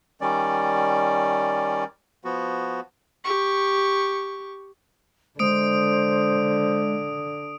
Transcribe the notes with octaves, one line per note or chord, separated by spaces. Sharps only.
D#3 G3 C#4 D5
F3 B3 F#4
G4 C#6
D3 G#3 C5 D#6 D7